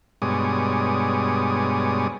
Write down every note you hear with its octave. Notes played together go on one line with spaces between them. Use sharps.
G2 B2 G#3 C#5 D5 D#6